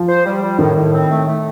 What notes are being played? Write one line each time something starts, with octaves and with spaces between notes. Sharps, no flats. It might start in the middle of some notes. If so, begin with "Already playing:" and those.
Already playing: F3
C5
G3
G3
A2 D#3
A2
C4
A3
A3